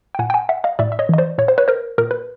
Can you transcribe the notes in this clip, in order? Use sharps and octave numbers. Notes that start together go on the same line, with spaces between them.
G5
A#2 F#5 G#5
G5
F#5 G#5
E5 F#5
D#5 F5
A2 D5 E5
E5
C#5 D#5
E3 D#5
C5 D5
A#2 C#5
C5
B4 C#5
A#4 C5
A#2 A#4
B4